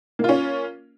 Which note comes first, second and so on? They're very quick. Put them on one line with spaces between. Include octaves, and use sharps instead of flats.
A#3 F4 C#4